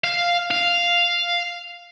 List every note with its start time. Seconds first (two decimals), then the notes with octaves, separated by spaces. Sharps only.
0.04 F5
0.51 F5